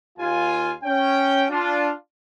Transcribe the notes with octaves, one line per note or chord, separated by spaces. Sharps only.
D#2 F4 G#5
C#4 G5
D4 F4